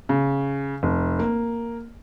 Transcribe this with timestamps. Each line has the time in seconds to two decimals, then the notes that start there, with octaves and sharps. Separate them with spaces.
0.09 C#3
0.83 F1
1.19 A#3